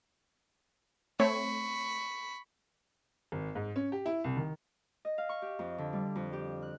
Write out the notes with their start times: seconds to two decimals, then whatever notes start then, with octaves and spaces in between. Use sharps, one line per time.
1.20 A3 C4 C#5 B5 C#6
3.32 G#1
3.55 G#2
3.76 C#4
3.92 G4
4.06 E4
4.24 C2
4.37 D#3
5.05 D#5
5.18 F5
5.29 C#6
5.42 G4
5.59 F2
5.78 D3
5.93 G3
6.16 F2
6.33 G4
6.62 F#6